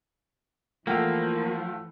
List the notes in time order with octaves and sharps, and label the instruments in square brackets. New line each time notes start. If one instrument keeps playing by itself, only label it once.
[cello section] E3 [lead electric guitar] F3 [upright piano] A3 F#5 G5 [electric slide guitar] A#3